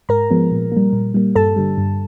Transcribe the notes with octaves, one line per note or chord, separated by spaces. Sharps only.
G#2 A#4 A#5
F3 G#3 B3
A#2
G3 A#3
A#2
G3 A#3
G2 A4 A5
D3 G3
G2